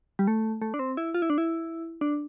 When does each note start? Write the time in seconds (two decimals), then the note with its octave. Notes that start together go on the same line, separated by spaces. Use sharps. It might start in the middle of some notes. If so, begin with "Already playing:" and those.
0.19 G3
0.27 A3
0.62 A3
0.74 D4
0.79 C4
0.97 E4
1.14 F4
1.22 E4
1.30 D4
1.38 E4
2.01 D4